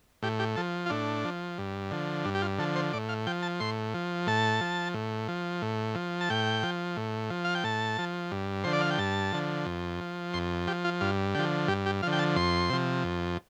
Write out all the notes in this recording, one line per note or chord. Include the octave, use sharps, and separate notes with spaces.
A2 G4
G4
F3 A4
F4
A2 D4
F3
G2
D3 F3
G2 D4
G4
F4
D3 F3 A4
C5
A2 D5
F5
F3 G5
A5
A2 C6
F3
A2 A5
F3
A2
F3
A2
F3
A5
A2 G5
F3
A2
F3
F5
G5
A2 A5
F3
G2
D3 F3 C5
D5
F5
G5
G2 A5
D3 F3
F2
F3
F2 C6
F3 G4
F4
G2 F4
D3 F3 G4
G2 G4
G4
D3 F3 F5
G5
A5
F2 C6
C3 F3
F2